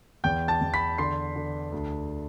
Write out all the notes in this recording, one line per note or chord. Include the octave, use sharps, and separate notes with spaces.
E2 G5 G6
A5 A6
E2
B5 B6
D3 C6 C7
D3
D2